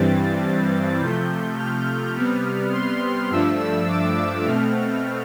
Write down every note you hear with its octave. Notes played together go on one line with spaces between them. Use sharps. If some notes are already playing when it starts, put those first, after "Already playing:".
Already playing: G2 E3 G3 C4 A6
C3 F3 A3 G6
F6
C3 G3 B3
C6
G2 F3 A3 D4 E6
E6
D6
B2 A3 C4 F6